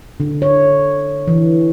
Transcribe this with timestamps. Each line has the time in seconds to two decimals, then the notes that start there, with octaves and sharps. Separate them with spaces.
0.20 D3
0.42 C#5
1.28 E3